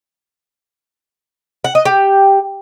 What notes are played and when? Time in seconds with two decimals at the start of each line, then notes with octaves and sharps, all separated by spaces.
1.64 F#5
1.75 D#5
1.85 G4